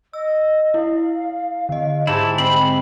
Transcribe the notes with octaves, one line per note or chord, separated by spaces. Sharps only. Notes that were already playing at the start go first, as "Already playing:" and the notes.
D#5 E6
E4 F5
D3 D#5
G#2 E4 G4 A5
C4 B5